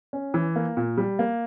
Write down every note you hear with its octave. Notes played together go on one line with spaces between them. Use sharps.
C#4
E3
A#3
A#2
G3
A#3